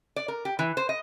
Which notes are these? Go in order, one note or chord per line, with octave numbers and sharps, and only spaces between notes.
D5
A#4
G4
E3
C5
D#5